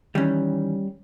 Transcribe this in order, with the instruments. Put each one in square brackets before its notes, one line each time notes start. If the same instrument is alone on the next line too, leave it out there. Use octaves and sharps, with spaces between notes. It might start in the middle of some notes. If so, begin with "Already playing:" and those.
[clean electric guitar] D#3 E3 [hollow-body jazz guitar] G3 C#4